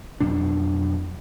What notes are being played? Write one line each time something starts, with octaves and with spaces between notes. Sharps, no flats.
F2 B2 F#3 D4